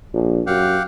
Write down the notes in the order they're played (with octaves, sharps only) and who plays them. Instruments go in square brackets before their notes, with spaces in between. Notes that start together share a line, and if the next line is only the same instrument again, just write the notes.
[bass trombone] A#1
[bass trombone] F#2 [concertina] G4 F5 F#5